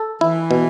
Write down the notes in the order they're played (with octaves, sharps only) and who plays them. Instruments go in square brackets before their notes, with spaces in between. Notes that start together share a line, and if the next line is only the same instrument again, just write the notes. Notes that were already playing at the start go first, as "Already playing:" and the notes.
Already playing: [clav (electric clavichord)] A4
[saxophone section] E3 [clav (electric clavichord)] E4
[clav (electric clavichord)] B2